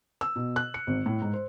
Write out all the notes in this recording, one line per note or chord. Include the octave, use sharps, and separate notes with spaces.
E6
B2
F#6
C#7
G#1
A2
G#2
C5